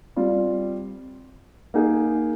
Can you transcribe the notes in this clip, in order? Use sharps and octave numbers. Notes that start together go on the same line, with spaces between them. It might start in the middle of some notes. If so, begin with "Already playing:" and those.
G3 C4 F4
A#3 D#4 G#4